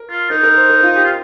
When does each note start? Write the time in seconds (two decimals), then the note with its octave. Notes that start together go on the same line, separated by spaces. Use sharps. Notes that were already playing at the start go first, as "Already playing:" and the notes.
Already playing: A#4
0.10 F4
0.30 D#4 A#4
0.43 A#4
0.56 C5
0.70 A#4
0.83 F4
0.96 G4
1.05 F4